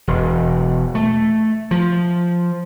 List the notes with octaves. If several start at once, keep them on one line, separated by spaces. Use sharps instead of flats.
E1
A3
F3